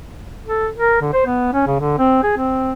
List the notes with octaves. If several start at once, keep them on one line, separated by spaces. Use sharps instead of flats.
A4
A#4
D3
C5
B3
C#4
C#3
D3
C4
G#4
C4